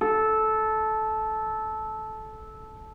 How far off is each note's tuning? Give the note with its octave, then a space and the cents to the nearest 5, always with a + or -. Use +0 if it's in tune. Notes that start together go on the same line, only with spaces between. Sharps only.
A4 -15